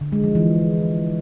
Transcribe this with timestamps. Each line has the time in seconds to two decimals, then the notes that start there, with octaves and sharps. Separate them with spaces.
0.01 D3
0.12 G#3
0.24 F3
0.35 E3